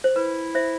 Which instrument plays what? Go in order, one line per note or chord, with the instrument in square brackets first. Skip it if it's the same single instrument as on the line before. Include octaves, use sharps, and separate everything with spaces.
[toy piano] C5
[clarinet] E4 [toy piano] B4
[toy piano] C5 E5